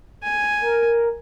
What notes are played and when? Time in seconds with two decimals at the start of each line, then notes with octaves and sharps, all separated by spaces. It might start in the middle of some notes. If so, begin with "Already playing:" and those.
0.23 G#5
0.61 A#4